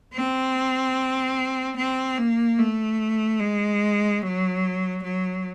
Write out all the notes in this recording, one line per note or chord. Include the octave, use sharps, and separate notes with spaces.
C4
C4
A#3
A3
G#3
F#3
F#3